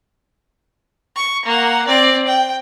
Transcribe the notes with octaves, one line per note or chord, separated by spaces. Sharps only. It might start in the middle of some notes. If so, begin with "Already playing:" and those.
C#6
A#3 F#5
C4 D5
G5